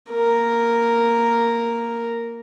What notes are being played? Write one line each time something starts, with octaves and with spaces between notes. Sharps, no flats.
A#3 A#4